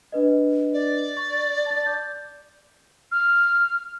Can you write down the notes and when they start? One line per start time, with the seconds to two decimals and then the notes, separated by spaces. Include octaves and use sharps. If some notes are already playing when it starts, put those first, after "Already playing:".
0.12 D4 B4 D#5
0.73 D5
1.17 C#6 A6
1.66 A5 A6
1.86 D6 G6
3.12 F6